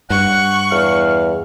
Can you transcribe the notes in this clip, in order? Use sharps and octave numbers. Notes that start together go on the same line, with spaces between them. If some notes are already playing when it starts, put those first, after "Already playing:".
G2 F#5 C#6 F#6
E2 F5